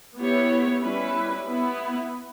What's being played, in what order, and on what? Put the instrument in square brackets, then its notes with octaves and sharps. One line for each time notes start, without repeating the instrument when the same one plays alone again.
[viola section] B3 E4 G4 C#5
G3 C#4 E4 B4
B3 E4 B4